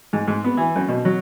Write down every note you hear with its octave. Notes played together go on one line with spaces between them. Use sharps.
G#2
G#2
B3
E3
F#2
B2
F#3